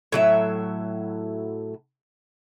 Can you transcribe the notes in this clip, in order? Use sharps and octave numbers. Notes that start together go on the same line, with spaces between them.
A2 F#3 E5